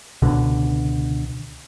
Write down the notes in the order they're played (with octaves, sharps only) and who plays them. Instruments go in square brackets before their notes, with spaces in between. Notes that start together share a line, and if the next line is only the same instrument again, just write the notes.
[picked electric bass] C#2 B2 D3